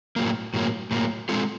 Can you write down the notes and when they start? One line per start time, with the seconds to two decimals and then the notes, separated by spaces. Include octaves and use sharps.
0.16 A2 F#3 A#3
0.54 A2 F#3 A#3
0.91 A2 F#3 A#3
1.29 G#3 C4 F4 A4